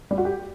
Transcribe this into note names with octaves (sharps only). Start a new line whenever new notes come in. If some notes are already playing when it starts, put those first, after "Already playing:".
G3
F#4
G4